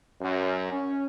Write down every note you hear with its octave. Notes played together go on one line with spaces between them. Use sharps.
F#2
C#4